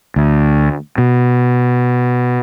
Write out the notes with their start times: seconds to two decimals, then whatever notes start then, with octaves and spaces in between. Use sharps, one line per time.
0.16 D2
0.98 B2